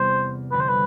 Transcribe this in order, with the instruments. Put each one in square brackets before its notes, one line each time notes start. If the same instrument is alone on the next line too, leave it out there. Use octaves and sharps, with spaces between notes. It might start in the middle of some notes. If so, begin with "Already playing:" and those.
Already playing: [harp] E2 C3 G3 B3 [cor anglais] C5
[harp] F2 D3 G3 C4 [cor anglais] B4
[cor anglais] C5
B4